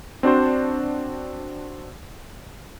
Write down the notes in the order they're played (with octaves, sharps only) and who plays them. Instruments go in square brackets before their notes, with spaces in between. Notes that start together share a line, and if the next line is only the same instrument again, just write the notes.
[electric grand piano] C4 D4 F#4 C5